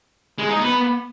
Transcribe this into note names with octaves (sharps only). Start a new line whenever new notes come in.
G#3
D#4
B3